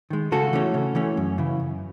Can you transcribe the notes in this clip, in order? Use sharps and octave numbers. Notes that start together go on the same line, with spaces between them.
D#3 G#3
C#3 F#4 A4
E3 A3 C#4
C#3
E3 A3 C#4
F#2
C#3 E3
F#2